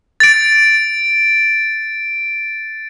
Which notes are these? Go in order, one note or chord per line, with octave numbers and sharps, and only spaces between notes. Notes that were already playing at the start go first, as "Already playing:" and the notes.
A6 D7